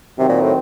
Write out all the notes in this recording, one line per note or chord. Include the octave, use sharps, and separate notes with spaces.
C3 D#3 F#3 C4
A#2
A2